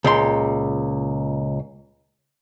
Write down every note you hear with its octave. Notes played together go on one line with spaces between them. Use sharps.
C#2 A#2 C6